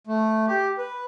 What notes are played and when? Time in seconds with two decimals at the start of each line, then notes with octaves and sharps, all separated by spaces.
0.07 A3
0.47 G4
0.78 B4